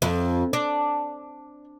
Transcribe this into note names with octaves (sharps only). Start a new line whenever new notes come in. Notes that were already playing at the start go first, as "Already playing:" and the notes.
F2
D4